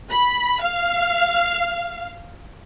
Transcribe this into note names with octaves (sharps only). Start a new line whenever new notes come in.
B5
F5